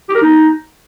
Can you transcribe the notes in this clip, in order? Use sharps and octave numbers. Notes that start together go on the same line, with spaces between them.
G4
A#4
D#4